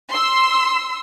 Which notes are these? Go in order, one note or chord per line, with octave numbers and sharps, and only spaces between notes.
C6 E6